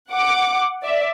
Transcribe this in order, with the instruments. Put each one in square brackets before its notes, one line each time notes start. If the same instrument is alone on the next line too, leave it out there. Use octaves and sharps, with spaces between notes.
[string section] F#5 D6
D5 E5